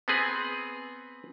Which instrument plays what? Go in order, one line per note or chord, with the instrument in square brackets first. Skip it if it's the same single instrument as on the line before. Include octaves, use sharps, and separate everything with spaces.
[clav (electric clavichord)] B3 C4 G#4 B4